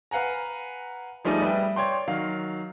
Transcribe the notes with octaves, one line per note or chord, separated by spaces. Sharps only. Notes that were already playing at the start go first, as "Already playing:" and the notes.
B4 F5 F#5 G#5 A#5
F3 G3 A3 D#4 G#4 D5
G3 B4 E5 G5
C#5 D5 G5 C6
D#3 F#3 F5